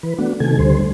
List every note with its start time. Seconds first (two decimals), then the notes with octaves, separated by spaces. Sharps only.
0.03 E3 B4
0.18 A3 B3 D4 F#4
0.40 C3 D#3 A3 A4 G#5
0.59 D2 D3 G3 C5